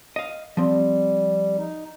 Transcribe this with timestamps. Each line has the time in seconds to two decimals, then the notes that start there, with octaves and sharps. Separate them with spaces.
0.16 D#5 F5
0.57 F3 G3 C4
1.58 D#4